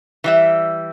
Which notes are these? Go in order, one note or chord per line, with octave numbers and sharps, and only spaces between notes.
E3 G3 E5